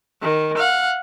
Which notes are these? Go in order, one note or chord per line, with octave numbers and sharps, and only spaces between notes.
D#3
F5 F#5